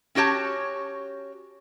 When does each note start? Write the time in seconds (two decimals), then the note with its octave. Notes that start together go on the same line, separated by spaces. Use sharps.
0.15 C#4 F#4 G4 C#5 A5